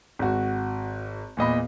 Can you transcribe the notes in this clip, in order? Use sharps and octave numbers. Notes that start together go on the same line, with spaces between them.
G#1 F#4
E2 A#2 D#5 B5